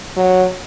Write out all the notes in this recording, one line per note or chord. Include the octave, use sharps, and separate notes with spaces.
F#3